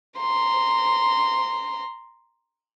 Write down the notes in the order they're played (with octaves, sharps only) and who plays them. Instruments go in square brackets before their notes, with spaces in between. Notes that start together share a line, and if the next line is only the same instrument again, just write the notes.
[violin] A#5 C6